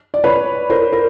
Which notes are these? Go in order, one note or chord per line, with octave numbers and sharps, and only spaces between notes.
D5
B4 C#5
A#4 C5
A#4